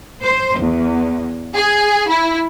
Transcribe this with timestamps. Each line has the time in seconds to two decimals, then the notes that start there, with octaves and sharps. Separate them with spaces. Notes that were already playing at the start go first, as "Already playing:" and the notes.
0.23 C5
0.59 E2
1.55 G#4
2.09 E4